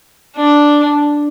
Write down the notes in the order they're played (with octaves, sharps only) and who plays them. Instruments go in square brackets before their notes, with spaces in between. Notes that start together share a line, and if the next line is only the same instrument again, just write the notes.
[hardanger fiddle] D4